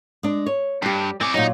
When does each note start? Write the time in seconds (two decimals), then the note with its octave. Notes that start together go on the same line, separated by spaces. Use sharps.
0.23 G#3 D4
0.46 C#5
0.82 G2 G3 G4
1.21 C4 D5 G#5
1.34 A#2 F#3 D#4